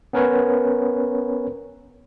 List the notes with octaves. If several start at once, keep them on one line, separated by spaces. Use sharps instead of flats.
B3 C#4 A#4 B4 C#5